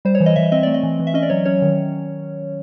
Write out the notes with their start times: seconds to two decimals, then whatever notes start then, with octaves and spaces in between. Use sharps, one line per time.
0.05 G3 C5
0.15 C#5
0.20 E3
0.26 D#5
0.36 E3 E5
0.52 C4 D#5
0.63 A3 D5
0.74 D#5
0.83 E3
0.99 E3
1.07 E5
1.14 C#4 D#5
1.23 D5
1.30 F#3 C#5
1.45 C#4 C#5
1.62 D#3